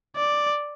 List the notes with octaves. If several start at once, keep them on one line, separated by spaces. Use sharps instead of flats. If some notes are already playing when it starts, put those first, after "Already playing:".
D5